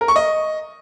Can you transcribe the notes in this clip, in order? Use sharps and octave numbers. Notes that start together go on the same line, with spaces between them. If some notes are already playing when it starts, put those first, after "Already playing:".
A#4
C#6
D#5